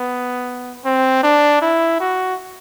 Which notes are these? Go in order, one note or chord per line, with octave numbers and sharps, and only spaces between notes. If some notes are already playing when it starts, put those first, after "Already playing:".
Already playing: B3
C4
D4
E4
F#4